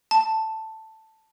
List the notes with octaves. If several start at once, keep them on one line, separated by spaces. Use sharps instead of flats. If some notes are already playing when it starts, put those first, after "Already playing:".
A5